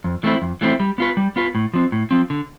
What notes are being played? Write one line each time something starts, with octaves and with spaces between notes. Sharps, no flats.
F2
E3 A3 C4 E4
F2
E3 A3 C4 E4
G3
B3 F4 B4
G3
B3 F4 B4
A2
F3 C4
A2
F3 C4
D3